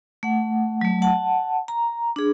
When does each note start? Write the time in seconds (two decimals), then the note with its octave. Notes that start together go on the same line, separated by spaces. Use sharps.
0.23 A3 F#5
0.81 F#3 A3
1.02 F#5 A5
1.68 A#5
2.16 D4 G#4